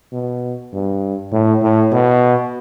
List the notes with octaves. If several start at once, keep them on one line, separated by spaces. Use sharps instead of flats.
B2
G2
A2
A2
B2